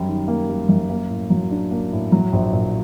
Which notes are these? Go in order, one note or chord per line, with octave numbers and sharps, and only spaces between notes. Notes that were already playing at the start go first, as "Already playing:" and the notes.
Already playing: F#2 G3
D#3
A#3
G3
F#2
A#3
A2
F#3
D4
A#3
A2
F#3
A#1
A#2